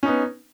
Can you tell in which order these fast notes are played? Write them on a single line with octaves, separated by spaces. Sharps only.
C#4 D#4 B3